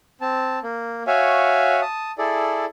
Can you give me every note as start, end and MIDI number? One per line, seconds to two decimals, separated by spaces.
0.21 0.59 60
0.21 0.59 81
0.63 1.03 58
1.07 1.81 66
1.07 1.81 73
1.07 1.81 76
1.07 1.81 77
1.07 1.81 80
1.82 2.12 81
1.82 2.12 87
2.18 2.65 64
2.18 2.65 68
2.18 2.65 69
2.18 2.65 74